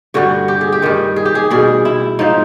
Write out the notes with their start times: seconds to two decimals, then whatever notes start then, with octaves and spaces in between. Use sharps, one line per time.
0.14 G2 D3 G3 F#4
0.48 G4
0.61 G#4
0.72 G4
0.82 G2 D#3 G3
1.16 G#4
1.25 G4
1.35 G#4
1.50 B2 G3 G#4
1.85 E4
2.19 G#2 F3 D#4